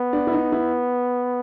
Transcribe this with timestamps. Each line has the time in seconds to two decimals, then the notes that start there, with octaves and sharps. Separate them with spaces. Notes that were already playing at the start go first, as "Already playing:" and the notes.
Already playing: B3
0.13 D4
0.27 E4
0.33 D#4
0.52 E4